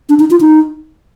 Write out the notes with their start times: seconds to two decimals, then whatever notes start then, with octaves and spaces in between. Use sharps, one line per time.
0.09 D4
0.19 D#4
0.31 F4
0.41 D#4